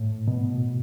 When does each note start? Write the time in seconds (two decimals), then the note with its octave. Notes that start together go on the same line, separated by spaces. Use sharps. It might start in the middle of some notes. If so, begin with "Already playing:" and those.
Already playing: A2
0.28 B2